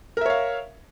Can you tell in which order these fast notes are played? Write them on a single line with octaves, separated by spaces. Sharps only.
A#4 E5 C#5 F5